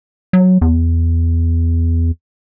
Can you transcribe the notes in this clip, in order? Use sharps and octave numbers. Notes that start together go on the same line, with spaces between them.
F#3
E2